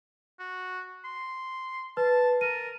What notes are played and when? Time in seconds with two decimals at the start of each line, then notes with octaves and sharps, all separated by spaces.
0.39 F#4
1.04 C6
1.97 B4 A5
2.41 A#4 D#7